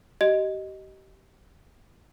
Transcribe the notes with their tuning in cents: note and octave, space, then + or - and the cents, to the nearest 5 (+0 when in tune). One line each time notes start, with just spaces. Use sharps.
G4 -30 D#5 +0